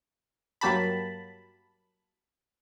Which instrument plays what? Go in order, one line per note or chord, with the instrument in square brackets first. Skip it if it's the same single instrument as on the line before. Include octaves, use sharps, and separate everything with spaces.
[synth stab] G2 F#3 A#3 G4 A5 B5